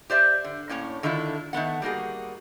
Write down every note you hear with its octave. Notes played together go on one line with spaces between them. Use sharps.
G4 C5 D5 E5
D3
A2 A#3 C#4 C#5
D3 D#3 A3 E4 F4
D#3 A3 B3 F#5
G3 A#3 F#4 G#4